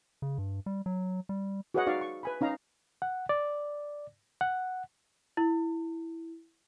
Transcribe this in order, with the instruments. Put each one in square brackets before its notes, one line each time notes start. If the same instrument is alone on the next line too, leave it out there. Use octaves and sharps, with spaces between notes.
[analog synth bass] C#3
G2
G3
F#3
G3
[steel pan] F#4 G#4 B4 C#5 D#5 F#5
D#4 F#4 D5 F5 C#6
C#6
B4 G#5 B5
C#4 D#4 F5 A#5
[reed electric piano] F#5
D5
F#5
[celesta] E4